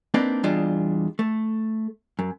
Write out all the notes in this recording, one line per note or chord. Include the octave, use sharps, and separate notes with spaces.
A#3 C4 D4 D#4 B4
E2 G3 D4 F4 D#5
A3
F#2